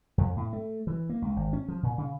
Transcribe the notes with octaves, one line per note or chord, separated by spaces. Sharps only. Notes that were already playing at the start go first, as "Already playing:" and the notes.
F2
A2
A3
E3
A#3
C#2
G#1
C#4
F3
A#2
C#3